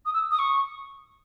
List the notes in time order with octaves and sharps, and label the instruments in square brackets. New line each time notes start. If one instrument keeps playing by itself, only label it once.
[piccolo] D#6
E6
D#6
C#6